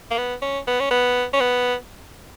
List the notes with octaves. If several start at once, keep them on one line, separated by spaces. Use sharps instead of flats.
A#3
B3
C#4
B3
C#4
B3
C#4
B3